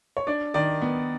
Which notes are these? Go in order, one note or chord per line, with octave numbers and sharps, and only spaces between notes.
C#5
D4 D5
D#3 D5
B3